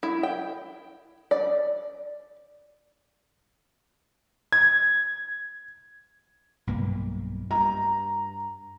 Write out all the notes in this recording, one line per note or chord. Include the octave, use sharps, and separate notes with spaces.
E4
G5
D5
G#6
B1 G2 A#3
G2 A#5